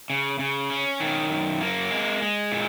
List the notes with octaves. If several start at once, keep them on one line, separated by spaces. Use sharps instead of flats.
C#3
C#3
C#4
D#3
F#2
A#3
G#3
G#3
A#2